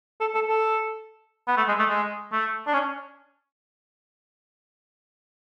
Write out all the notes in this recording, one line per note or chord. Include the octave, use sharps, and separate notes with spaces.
A4
A4
A4
B3
A3
G#3
A3
G#3
A3
D4
C#4